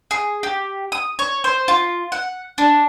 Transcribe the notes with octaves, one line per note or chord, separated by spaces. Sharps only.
G#4
G4
D#6
C#5
C5
F4
F#5
D4